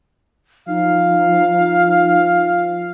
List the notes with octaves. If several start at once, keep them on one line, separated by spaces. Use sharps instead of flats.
F3 D#4 F5